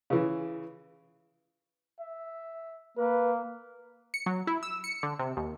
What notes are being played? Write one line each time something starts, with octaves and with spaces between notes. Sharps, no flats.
C#3 E3
E5
A#3 B4
C#7
F#3
E4
E6
C#7
D3
C3
D#2